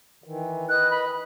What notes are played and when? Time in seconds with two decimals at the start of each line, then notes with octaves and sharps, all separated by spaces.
0.24 D#3 E3
0.69 B4 D#5 F#6
0.91 B5